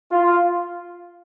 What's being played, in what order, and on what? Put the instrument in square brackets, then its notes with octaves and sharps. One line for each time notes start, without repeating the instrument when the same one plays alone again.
[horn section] F4